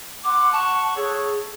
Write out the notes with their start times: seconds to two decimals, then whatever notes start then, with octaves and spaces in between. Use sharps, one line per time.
0.24 F#5 C6 D6
0.52 F#5 A5 C#6
0.96 G#4 A4 C#5